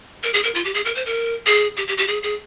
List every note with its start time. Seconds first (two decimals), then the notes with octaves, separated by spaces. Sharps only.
0.23 A#4
0.34 G#4
0.44 A#4
0.55 F4
0.65 G4
0.74 G#4
0.85 A#4
0.95 C5
1.06 A#4
1.46 G#4
1.77 G4
1.88 G4
1.98 G4
2.08 G#4
2.23 G#4